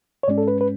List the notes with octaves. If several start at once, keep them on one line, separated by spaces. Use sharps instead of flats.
C#5
G#2 G#3 C#4 D5
A4
B4
B4